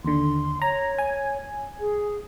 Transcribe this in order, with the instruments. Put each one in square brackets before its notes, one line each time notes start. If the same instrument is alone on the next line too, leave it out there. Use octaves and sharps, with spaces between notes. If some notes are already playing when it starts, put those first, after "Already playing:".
[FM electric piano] D#2 D3 [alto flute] C6
[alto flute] C#5 [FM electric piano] A#5
[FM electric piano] G#5
[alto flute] G#4